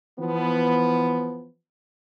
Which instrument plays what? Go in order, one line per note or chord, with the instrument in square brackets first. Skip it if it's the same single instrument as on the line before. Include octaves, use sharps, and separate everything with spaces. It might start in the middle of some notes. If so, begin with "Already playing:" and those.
[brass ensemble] E3 F3 B3